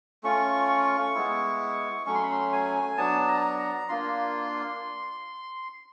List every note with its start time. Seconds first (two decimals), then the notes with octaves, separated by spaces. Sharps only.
0.23 A3 C#4 F4 C#6
1.15 G#3 B3 E4
2.06 F#3 A3 C#4 C#6
2.15 C6
2.23 B5
2.31 C6
2.53 G#5
2.97 F#3 B3 D4 A5
3.28 A#5
3.59 A#5
3.89 A#3 D4 F4 C6